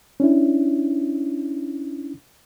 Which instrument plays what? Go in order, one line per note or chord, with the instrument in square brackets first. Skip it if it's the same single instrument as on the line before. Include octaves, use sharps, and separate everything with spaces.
[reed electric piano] C#4 D4 E4